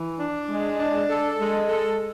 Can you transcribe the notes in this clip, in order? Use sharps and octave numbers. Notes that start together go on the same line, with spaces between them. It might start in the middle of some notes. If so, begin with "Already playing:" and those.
Already playing: E3
D4
G#3
D4
A4
G#3
A4